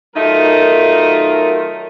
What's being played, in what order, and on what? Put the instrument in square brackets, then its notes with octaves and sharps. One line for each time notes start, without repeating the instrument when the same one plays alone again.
[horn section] D#3 F#3 A3 D#4 F4 A#4